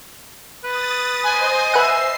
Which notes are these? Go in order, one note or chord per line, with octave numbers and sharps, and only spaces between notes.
B4 D#6 A6
C5 D#5 G#5
B4 E5 F#5 C7